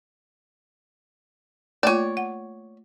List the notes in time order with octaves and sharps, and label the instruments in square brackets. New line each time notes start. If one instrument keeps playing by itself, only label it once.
[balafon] A3 A#3 F4 [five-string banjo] C#5 D5
[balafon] F#5